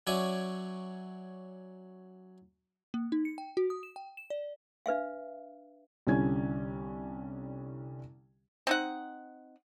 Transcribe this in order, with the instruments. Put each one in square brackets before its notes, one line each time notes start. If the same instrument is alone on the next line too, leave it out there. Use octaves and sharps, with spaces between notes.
[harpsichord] F#3 C#4 D5 E5 G#5 D6
[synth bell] A#3
D#4
C#7
G5
F#4
D#6
E7
G5
E7
D5
[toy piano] D4 B4 E5 F5
[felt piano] C2 D3 G3 C#4 E4 G#6
[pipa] C4 D#4 F#5